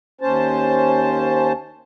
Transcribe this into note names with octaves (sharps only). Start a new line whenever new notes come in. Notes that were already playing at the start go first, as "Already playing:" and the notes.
D#2 C#4 C5 A5